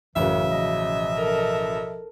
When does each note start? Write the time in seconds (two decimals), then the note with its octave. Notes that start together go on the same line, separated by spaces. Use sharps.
0.16 A1 F#2 C#3 E3 F#3 E5
0.50 B2 F3 D#5
1.16 A4 A#4